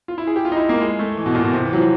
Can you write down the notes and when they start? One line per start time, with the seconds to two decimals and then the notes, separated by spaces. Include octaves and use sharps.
0.08 F4
0.18 E4
0.27 G#4
0.36 G4
0.45 F4
0.52 D#4
0.57 E4
0.69 A#3
0.81 G#3
0.99 A3
1.17 E3
1.26 B2
1.35 A#2
1.44 B2
1.53 C3
1.65 E3
1.73 F#3
1.78 F3